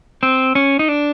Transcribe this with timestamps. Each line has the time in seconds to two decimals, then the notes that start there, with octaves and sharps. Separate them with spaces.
0.23 C4
0.55 C#4
0.79 D#4
0.88 D4